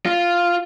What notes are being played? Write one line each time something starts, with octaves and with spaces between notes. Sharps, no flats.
F4